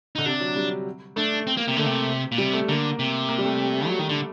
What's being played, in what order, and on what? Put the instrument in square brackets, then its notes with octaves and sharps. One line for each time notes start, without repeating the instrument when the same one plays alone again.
[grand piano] D3 [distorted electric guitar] D#4
[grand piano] C3 [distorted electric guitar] D4
[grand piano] F#3
G3
[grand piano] A3 [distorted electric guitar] D4
[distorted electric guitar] C4
A#3
[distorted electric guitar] C3 [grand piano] A#3
[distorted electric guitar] D3 [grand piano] A3
[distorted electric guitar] C3
A#2
[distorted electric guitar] C3 [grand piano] G3
[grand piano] A3
[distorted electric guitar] D3 [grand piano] A#3
[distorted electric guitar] C3
[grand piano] A#3
G3
A3
[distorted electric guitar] F#3
D#3
D3